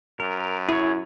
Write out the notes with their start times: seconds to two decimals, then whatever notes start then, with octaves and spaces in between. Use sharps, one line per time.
0.20 F#2 A#4
0.69 E4 G#4 C#5